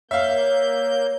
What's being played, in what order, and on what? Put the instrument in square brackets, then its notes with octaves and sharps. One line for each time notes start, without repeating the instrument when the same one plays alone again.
[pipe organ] A#3 G6 [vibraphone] C#5 [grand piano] E5 F5